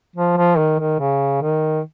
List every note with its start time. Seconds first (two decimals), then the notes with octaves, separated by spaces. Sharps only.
0.16 F3
0.37 F3
0.58 D#3
0.79 D#3
1.00 C#3
1.42 D#3